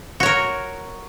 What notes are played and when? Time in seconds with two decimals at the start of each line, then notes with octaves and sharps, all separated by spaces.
0.20 F#4
0.23 C#5
0.26 A#4